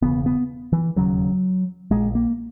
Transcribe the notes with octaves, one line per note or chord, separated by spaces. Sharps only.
E1 E2 C#3 B3
B3
E3
E1 D#2 C#3 F#3
A#1 A#2 G#3
A#3